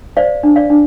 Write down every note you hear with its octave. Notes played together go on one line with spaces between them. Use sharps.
C5 D5 F5
D4
D5 F5
D4